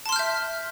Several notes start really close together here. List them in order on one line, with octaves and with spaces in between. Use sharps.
A5 C6 F6 G6 E5